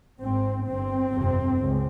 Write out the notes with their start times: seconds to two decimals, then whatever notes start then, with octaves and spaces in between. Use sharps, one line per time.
0.21 G#1 G#2 C4
0.67 G1 G2 C4
1.11 G1 F2 C3
1.57 C#2